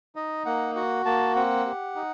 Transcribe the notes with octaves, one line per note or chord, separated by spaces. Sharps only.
D#4 D#5
A#3 F#5
F#4 F#5
A#3 A5
C4 F#5
G4
D#4